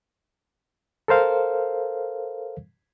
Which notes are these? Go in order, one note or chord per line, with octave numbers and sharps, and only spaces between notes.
A4 A#4 C5 F5